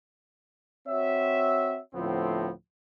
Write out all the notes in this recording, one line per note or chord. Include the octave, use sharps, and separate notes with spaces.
C4 F#4 C#5 E5
D2 A2 F3 B3 C4